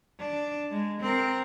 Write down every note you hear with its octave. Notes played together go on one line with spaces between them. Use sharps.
D4
G#3
C4 A#4